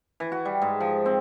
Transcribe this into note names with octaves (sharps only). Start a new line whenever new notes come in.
E3
F#4
G3
G#2
F3
C4